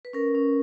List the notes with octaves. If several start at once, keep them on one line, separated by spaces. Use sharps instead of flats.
B4
C#4 A#4
C#4